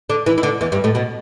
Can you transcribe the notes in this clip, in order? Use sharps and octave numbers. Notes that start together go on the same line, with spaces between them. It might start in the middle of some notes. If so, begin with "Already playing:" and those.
D3 D4
E3 E4
E4
D3 D4
E2 E3
G2 G3
A2 A3
B2 B3